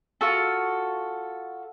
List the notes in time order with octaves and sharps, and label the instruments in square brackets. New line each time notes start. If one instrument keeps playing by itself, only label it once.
[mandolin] F4 F#4 A4